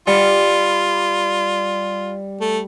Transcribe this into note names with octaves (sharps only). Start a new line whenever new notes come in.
G3 F4
A3